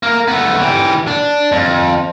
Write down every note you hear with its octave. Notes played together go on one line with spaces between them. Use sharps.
A#3 A#4
A3 B3
E3 G4
D4
F2